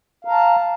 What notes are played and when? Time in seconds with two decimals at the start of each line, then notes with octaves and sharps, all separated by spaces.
0.25 F5
0.28 A#5
0.31 A5